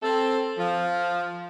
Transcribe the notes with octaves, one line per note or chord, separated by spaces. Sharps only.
C4 A4
F3